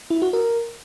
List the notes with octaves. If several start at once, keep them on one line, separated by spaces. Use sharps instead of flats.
E4
F#4
A#4